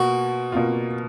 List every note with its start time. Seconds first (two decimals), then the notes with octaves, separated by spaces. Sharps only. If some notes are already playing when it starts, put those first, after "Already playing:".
Already playing: B2 A#3 F4 F#4
0.52 B2 A#3 F4